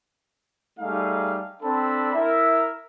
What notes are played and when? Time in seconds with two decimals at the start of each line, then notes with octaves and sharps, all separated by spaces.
0.80 G3 A3 D#4 G#4 F5
1.63 C4 D4 A4 A5 B5
2.14 E4 A#4 E5